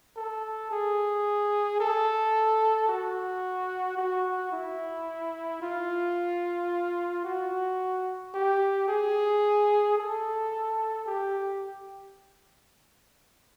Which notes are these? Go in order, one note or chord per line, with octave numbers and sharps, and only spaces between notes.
A4
G#4
A4
F#4
F#4
E4
F4
F#4
G4
G#4
A4
G4